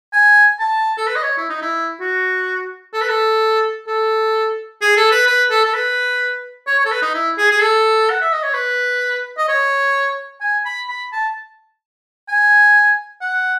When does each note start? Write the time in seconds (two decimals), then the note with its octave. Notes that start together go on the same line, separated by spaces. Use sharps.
0.13 G#5
0.59 A5
0.98 A4
1.07 B4
1.16 D#5
1.23 C#5
1.37 E4
1.49 D#4
1.62 E4
2.00 F#4
2.93 A4
3.01 B4
3.09 A4
3.87 A4
4.81 G#4
4.97 A4
5.12 B4
5.27 B4
5.50 A4
5.65 A4
5.74 B4
6.67 C#5
6.79 C#5
6.85 A4
6.92 B4
7.02 D#4
7.14 E4
7.38 G#4
7.51 G#4
7.61 A4
8.10 F#5
8.21 E5
8.32 D#5
8.44 C#5
8.54 B4
9.38 D#5
9.48 C#5
10.41 G#5
10.65 B5
10.88 B5
11.12 A5
12.29 G#5
13.21 F#5